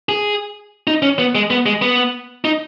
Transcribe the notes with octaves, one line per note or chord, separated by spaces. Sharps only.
G#4
D#4
C#4
B3
G#3
B3
G#3
B3
D#4